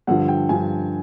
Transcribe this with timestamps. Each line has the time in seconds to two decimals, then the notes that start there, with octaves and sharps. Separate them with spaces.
0.07 G2 D3 F3 F#5
0.28 G5
0.49 G2 D3 F3 G#5